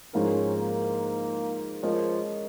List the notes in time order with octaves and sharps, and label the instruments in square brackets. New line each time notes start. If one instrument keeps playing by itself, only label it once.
[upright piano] G#2 F3 G#3 F4 A#4 [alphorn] C#4
[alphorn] A#3
[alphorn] F3 [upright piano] G#3 C#4 A#4 D#5